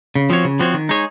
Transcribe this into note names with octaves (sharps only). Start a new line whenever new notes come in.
C#3
F3 C4 F#4 C#5
C#3
F3 C4 F#4 C#5
D#3
G#3 D#4 G#4 C#5